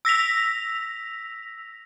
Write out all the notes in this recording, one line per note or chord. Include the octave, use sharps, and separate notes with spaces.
E6 A#6 B6 F7